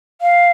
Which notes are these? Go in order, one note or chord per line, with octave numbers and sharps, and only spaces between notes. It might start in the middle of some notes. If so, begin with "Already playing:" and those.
F5